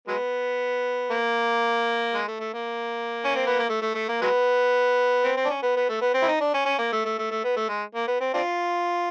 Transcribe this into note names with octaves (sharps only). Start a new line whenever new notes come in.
F#3 G#3 B3
A#3
G#3
A3
A3
A#3
C#4
C4
B3
A#3
A3
A3
A3
A#3
F#3 G#3 B3
C4
C4
D4
C#4
B3
B3
A3
B3
C4
E4
D#4
D4
C#4
C#4
A#3
A3
A3
A3
A3
B3
A3
G#3
A#3
B3
C4
C4 D4 F4